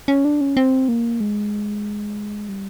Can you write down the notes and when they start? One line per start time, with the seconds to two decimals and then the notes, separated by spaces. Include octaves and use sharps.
0.08 C#4
0.25 D4
0.41 C#4
0.57 C4
0.88 A#3
1.20 G#3
2.49 G3